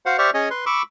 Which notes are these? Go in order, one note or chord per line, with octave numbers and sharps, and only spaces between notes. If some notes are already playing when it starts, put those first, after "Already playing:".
F#4 C5 F5 F#5
G4 C5 D5 E5 C#6 F6
C#4 G#4 C#5 D#5
B4 C6
B5 C#6 D6 E6